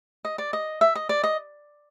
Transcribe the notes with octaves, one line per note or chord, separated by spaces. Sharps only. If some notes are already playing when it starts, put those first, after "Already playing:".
D#5
D5
D#5
E5
D#5
D5
D#5